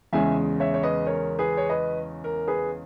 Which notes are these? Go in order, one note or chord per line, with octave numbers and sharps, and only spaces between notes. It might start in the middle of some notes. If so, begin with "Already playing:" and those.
E2 C#3 G#3 C#4 E5 G#5
C#5 E5
C#5
B4 D#5
A#4 C#5
G#4 B4
C#5
B4 D#5
A#4
G#4 B4